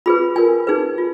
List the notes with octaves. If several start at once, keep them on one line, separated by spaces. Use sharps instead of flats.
F4 G#4 B4 B5
F4 A#4 G#5
D#4 G#4 B4
F4